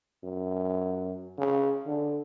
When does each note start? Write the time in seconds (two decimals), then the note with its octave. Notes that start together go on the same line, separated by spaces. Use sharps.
0.24 F#2
1.38 C#3
1.87 D3